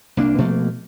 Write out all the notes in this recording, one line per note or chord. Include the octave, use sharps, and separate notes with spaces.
C2 A#3 D4
B2 F3 A3 A#3